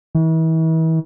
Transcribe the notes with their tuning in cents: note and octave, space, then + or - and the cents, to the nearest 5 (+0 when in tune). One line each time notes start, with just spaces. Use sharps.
E3 -40